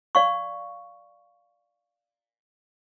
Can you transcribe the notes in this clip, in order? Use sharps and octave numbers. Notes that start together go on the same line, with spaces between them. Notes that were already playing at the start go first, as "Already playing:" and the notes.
D5 F5 C#6